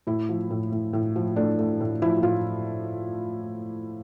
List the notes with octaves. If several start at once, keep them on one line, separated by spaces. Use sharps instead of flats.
A2 E4
F3
A2
A2
A2
F3
A3 D4
A3
A2
F3 E4
A2 F4